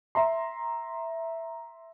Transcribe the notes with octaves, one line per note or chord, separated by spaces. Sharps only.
E5 A#5 C6